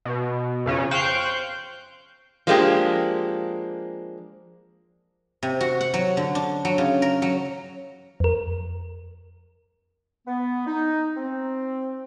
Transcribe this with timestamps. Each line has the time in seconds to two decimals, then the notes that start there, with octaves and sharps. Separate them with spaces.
0.05 B2
0.66 F2 C#3 C#4
0.91 C5 F5 G5 C#6 F#6 G6
2.47 F3 G#3 A#3 D4 G4
5.43 C3
5.61 F#4
5.81 F#5
5.94 F#3
6.17 D3
6.35 D4
6.65 F#3
6.78 C#3
7.02 A#4
7.22 F#3
8.20 F2 A#4
10.27 B3
10.67 D#4
11.16 C4